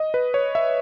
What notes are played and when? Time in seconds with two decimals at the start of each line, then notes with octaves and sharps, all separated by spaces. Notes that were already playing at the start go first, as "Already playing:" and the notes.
Already playing: D#5
0.14 B4
0.34 C#5
0.55 E5